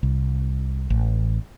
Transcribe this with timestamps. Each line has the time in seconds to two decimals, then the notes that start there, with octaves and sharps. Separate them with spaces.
0.03 C2
0.90 A1